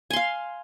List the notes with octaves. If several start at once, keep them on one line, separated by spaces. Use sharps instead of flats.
F5 G#5 C6